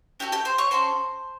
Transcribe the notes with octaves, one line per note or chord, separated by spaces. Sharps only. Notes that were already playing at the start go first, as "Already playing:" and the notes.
C#4 F#4 G4 A4 G5
G4 G5
C5 C6
C#5 C#6
C#4 F#4 A4 C5 C6